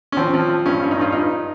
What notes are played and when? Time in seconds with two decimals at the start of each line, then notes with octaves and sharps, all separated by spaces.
0.12 C#4
0.17 F3 C4
0.34 F3
0.49 F3
0.66 G2 C#4
0.83 G2
0.91 D#4
0.99 G2 F4
1.12 G2 D#4